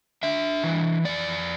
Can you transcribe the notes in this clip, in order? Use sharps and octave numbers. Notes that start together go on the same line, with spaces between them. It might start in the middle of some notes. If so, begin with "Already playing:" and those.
D4 E5
E3
F2 D5